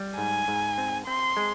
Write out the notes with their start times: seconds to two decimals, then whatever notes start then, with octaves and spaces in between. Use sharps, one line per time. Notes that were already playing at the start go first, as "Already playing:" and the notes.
Already playing: G3
0.17 G#2 G#5
0.48 G#2
0.78 C4
1.06 C4 C6
1.37 G#3